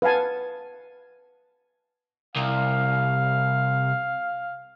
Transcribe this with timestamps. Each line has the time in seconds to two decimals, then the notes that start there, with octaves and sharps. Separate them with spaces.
0.02 B4 F5 F#5 G#5 A5
2.36 C2 F5